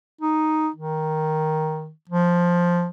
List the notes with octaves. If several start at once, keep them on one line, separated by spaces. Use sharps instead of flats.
D#4
D#3
F3